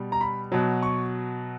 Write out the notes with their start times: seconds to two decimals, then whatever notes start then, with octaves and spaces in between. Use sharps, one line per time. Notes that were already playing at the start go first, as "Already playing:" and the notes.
Already playing: B2 G3
0.12 A#5
0.21 B5
0.52 B2 F#3
0.83 C#6